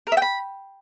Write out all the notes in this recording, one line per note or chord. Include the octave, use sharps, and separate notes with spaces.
A#4
E5
G5
B5